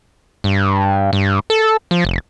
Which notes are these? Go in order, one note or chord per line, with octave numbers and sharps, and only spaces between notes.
G2
G2
A4
F3
F1